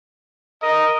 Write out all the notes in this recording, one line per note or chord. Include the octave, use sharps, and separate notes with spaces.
A#4 D#5